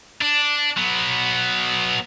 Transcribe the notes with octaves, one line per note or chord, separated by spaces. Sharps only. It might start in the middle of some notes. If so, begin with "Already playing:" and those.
D4
F#3 B3